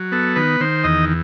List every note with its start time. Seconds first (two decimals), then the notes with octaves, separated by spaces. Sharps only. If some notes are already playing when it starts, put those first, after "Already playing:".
Already playing: F#3
0.12 B3 A4
0.36 D#3 B4
0.60 D#3 C5
0.84 E2 D#5